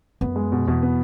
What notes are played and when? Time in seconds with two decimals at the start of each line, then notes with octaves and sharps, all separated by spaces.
0.21 F#2 B3
0.36 G#3
0.52 B2
0.67 E2 B2
0.82 B3